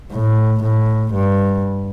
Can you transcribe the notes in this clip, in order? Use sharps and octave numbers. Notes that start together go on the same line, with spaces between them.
A2
A2
G2